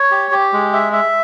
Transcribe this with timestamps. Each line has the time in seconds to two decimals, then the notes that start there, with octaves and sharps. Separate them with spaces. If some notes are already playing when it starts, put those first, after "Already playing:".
Already playing: C#5
0.11 G4
0.31 G4
0.53 G#3
0.73 E5
0.93 E5